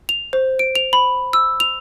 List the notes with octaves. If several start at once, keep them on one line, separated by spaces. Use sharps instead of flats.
F7
C5
D7
F7
B5
E6
F7